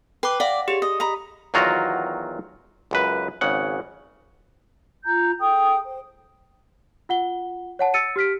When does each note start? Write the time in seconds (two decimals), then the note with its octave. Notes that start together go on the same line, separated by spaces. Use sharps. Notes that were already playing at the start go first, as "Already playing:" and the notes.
0.23 B4 G5 D6
0.40 D5 F5 F#5
0.68 G4 G#4 C#5
0.82 D#5
1.00 D#5 A#5 B5
1.54 E2 D#3 F#3 F4 F#4 A#5
2.91 C#2 F#2 B4
3.41 G#1 C#3 F#5
5.05 F4 A#5 G6
5.41 G#4 A4 G5 D#6
5.85 C5
7.09 F4 F#5 G7
7.79 C#5 F#5 A5
7.94 E6 A6 C#7 D#7
8.16 G4 F6 B6 D7